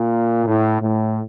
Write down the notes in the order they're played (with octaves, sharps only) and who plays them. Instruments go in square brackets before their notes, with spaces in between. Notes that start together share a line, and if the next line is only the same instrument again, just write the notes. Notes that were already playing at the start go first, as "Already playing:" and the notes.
Already playing: [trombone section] A#2
A2
A2